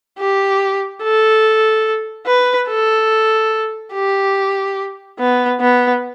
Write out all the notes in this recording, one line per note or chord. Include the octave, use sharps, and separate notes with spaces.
G4
A4
B4
A4
G4
B3
B3